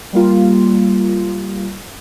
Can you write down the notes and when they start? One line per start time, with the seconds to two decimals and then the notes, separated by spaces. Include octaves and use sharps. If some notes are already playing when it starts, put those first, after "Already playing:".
0.13 G3 A#3 F4